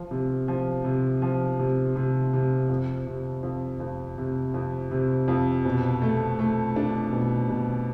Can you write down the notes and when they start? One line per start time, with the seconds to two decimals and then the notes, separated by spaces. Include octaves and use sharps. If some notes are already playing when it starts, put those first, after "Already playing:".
Already playing: F3
0.11 C3
0.48 F3
0.84 C3
1.22 F3
1.59 C3
1.96 C3
2.33 C3
2.69 F2
3.07 C3
3.43 F2
3.80 F2
4.18 C3
4.54 F2
4.91 C3
5.28 F2
5.65 B2
6.02 A3
6.39 A3
6.76 D4
7.12 B2
7.49 B2